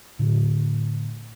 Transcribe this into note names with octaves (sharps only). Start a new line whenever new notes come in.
A2 D3